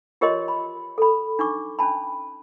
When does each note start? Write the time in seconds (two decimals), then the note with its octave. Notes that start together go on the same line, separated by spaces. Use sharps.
0.21 F4 G4 A#4 C#5 D#5 C6
0.48 B5
0.98 A4 B5
1.39 D4 D#4 C#6 D6
1.79 C#4 D4 A5 B5